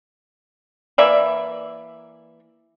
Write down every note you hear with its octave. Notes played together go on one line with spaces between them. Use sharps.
E3 A#3 D5 E5